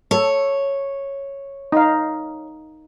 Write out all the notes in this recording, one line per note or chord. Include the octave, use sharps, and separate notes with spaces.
A4 C#5
D#4 F5